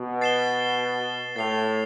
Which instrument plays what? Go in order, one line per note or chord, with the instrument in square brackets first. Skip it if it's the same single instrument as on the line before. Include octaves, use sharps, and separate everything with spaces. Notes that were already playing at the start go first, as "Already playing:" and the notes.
Already playing: [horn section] B2
[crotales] A6 C7 E7 G7
[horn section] A2 [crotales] A6 C7 F7